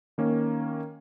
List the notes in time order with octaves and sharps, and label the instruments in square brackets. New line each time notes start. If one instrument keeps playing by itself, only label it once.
[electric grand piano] D#3 A#3 C#4